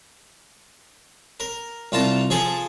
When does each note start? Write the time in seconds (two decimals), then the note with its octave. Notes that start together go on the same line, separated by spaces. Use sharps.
1.40 A#4
1.92 C2 F4 A5 A#5
2.30 F3 G#4 A4